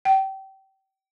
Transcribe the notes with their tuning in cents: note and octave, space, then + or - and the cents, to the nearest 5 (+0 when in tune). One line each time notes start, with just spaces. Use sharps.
G5 -25